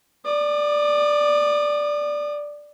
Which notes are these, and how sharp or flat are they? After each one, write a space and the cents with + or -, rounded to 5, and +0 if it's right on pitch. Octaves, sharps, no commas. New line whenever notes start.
D5 +0 D#6 -40